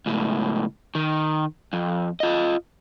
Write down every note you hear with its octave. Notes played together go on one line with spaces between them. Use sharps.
C#2 A2
D#3
F2
F4 D#5